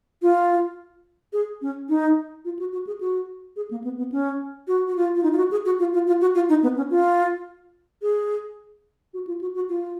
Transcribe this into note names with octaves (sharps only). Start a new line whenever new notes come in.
F4
G#4
C#4
D#4
F4
F#4
F#4
G#4
F#4
G#4
A#3
B3
B3
C#4
F#4
F#4
F4
F4
D#4
F4
F#4
G#4
F#4
F4
F4
F4
F#4
F4
D#4
B3
C#4
F4
G#4
F#4
F4
F#4
F#4
F4